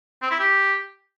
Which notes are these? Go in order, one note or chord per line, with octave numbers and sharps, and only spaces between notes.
C4
E4
G4